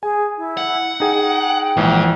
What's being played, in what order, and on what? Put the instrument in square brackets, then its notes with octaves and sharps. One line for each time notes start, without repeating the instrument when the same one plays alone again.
[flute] G#4 [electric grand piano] G#5
[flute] E4
[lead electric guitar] F#5
[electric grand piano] D#4 G#4 [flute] G5
[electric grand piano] A#1 E3 [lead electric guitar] G#2